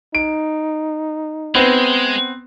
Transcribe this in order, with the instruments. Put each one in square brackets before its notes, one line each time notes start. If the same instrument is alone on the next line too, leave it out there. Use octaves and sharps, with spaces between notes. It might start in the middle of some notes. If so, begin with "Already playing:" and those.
[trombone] D#4 [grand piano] D7
[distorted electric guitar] G#3 [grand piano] B3 C4